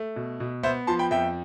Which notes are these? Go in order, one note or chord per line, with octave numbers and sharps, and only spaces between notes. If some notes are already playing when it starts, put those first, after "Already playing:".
Already playing: A3
B2
B2
B3 C5 E5
F3 A5 C6
G5 B5
F2 E5 G5